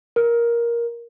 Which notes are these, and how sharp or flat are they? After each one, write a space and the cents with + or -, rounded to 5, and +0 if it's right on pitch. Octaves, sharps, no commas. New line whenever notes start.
A#4 +10